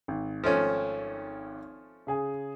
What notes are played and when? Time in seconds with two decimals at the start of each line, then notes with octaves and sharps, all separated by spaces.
0.08 G#1
0.44 F3 A3 C#4
2.07 C#3 G#4 G#5